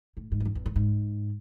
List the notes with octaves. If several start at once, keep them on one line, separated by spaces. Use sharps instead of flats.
A2
G#2
E2
F#2
E2
A2
G#2